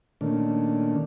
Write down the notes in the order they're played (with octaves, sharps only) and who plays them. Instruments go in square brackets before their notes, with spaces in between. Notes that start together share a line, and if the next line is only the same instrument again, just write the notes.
[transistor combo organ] A#2 D#3 A3 C#4 D4